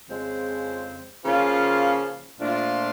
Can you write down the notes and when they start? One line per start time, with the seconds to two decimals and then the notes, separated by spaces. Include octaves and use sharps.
0.08 F2 C#3 F3 G#3 C4
1.24 C#3 F3 A#3 C#4 F4
2.39 A#2 F3 A3 D4 F4